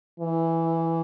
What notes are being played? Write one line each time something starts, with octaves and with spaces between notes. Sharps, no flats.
E3